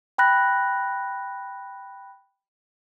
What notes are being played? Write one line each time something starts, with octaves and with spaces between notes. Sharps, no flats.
G5 B5 F#6 A#6